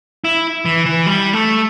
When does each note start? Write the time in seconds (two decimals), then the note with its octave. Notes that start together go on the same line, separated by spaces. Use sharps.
0.24 E4
0.65 E3
0.86 E3
1.06 G3
1.33 A3